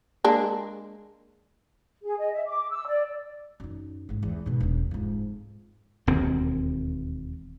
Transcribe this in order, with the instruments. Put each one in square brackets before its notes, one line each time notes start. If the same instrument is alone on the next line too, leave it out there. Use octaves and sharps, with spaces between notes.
[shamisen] G#3 A#3 D4
[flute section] G#4
D#5
E5
D6
E6
D5
[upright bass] F#2 D#3
A1 G#2
E2
G#2 B2
E1 F#3
F2 G#2
[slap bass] E1 D#2 C4